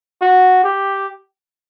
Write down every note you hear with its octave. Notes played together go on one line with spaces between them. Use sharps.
F#4
G4